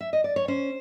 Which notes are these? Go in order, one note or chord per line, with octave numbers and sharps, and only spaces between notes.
E5
D#5
D5
C#5
C#4 C5